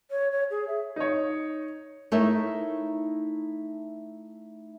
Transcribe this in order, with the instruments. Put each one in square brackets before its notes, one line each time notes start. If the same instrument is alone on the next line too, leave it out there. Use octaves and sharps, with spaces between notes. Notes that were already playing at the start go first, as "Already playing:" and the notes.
[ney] C#5
C#5
G#4
E5
[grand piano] D#4 C#5
[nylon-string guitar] A3 D#4 E4 A#4 C#5 E5